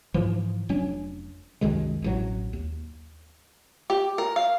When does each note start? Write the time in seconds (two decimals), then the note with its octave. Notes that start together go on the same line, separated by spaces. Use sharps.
0.14 G#2 E3 F3
0.69 F1 F#3 C#4 D4
1.61 C2 F#2 D#3 G#3
2.02 E1 A1 F#3
2.53 D#2
3.90 G4
4.18 A#4
4.36 F5